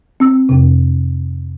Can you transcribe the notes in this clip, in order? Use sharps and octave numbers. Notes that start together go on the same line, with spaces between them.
C4 E6
F2 C3